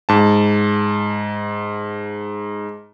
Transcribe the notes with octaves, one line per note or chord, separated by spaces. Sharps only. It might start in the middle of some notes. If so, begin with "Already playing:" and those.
G#2 A5